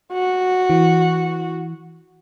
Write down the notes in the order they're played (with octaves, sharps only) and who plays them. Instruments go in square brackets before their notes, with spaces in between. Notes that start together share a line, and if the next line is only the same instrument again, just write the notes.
[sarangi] F#4
[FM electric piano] E3